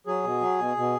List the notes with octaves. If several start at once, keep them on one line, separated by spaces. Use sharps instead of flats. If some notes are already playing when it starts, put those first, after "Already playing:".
F#3 G#4
B2
F#3
B2
B2